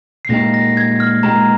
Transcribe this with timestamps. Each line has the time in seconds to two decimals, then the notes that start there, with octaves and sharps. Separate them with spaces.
0.25 C7
0.29 A#2 G#3 D#4 G4 A#4 A#6
0.54 A#6
0.77 G#6
1.00 F6
1.23 A#2 G#3 D#4 G4 A#4 A#5